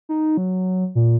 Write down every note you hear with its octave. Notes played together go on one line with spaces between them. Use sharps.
D#4
F#3
A#2